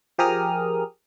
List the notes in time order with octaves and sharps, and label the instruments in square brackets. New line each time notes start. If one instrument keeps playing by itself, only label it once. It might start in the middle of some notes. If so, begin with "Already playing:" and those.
[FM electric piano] F3 G4 G#4 A#4 D#6 F6